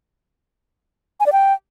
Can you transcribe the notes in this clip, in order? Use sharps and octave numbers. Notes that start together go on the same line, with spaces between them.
G#5
D5
G5